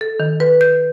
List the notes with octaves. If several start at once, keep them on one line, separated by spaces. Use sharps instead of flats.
A4
D#3
B4
G6